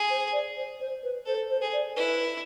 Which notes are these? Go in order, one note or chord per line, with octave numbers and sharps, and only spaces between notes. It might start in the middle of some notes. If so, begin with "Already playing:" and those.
Already playing: G#4
C5
D5
C5
C5
B4
A4 C5
C5
G#4
D5
E4 B4